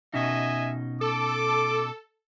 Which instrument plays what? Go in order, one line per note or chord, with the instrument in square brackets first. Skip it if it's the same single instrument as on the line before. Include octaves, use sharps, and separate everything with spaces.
[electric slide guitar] B2 C#4 D#4 [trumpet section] D#5 E5 G#5
[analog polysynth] A4 [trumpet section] D6